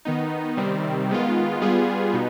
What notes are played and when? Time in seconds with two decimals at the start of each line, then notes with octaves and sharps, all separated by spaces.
0.05 D#3 B3 D#4
0.57 C3 D#3 G3 C4
1.10 D#3 G#3 B3 F4
1.61 G3 B3 F4 G#4
2.13 B2 B3 D#4